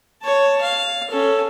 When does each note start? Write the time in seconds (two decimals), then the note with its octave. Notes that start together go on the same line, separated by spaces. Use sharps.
0.22 C#5 A5
0.61 F5
1.10 C#4 A4